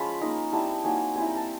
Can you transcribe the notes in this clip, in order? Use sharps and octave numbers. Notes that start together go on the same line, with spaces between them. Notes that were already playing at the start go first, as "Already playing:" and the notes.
Already playing: F3 G#3 C#4 F4 B5
A#3 D#4 A#5
G3 C4 E4 A5
F#3 A#3 D#4 G#5
G3 C4 E4 G#5
A#5
A5